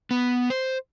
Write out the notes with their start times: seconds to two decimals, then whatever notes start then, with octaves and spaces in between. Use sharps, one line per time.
0.11 B3
0.50 C5